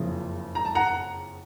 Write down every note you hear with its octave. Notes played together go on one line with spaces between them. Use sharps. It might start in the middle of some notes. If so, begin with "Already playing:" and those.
Already playing: F#1 F2 C#3 F3
A#5
A5
F#5 A#5